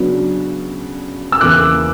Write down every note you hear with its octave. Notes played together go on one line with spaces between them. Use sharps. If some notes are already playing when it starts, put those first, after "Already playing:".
Already playing: C#3 F#3 B3 D4
E6
E2 C#3 E3 A#3 D6 F#6